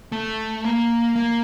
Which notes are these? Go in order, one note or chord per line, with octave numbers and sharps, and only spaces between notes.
A3
A#3
A#3